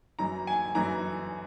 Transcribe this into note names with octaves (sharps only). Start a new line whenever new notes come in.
F#2 E3 A#5
G#5
F#2 E3 A#5